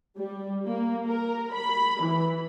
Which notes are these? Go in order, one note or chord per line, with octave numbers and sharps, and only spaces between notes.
G3
A#3
A#4
B5
E3